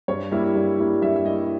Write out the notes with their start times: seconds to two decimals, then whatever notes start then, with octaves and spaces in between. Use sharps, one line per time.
0.08 G2 C#5
0.31 G3 A#3 E4
0.55 G2
0.78 G3 A#3 E4
1.02 G2 E5
1.16 E5
1.25 G3 A#3 E4 D#5